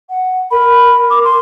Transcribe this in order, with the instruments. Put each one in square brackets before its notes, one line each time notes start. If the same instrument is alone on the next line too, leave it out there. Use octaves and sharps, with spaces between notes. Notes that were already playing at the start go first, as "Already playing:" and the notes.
[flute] F#5
[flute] A#4 [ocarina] B5
[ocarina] D6
C6